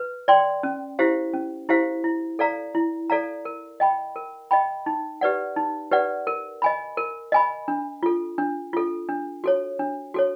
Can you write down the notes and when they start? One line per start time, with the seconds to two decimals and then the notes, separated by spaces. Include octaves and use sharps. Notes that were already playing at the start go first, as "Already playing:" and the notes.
Already playing: B4
0.28 D5 G5 C6
0.63 C#4
0.99 E4 G4 C5 F5
1.33 C#4
1.69 E4 G4 C5 F5
2.04 E4
2.39 A4 D5 F5 A#5
2.75 E4
3.10 A4 D5 F5 A#5
3.45 A#4
3.80 D#5 G5 B5
4.16 A#4
4.51 D#5 G5 B5
4.86 D#4
5.21 G4 B4 D5 F#5
5.56 D#4
5.91 G4 B4 D5 F#5
6.27 A#4
6.62 D#5 G#5 B5
6.97 A#4
7.32 D#5 G#5 B5
7.68 D4
8.03 F4 A4
8.38 D4
8.73 F4 A4
9.09 D4
9.44 F#4 A4 C#5
9.79 D4
10.14 F#4 A4 C#5